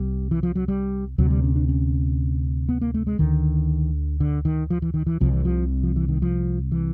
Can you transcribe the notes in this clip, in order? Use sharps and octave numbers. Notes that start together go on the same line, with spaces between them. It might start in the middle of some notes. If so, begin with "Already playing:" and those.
Already playing: C2 C3 G3
E3
F3
F#3
G3
D2 C3 F#3
G3
C#4
D4
C#4
B3
A#3
A3
G#3
D2 D3 D#3
D3
D#3
F3
E3
D#3
E3
C2 C3 F3
E3
F3
F3
E3
D#3
F3
E3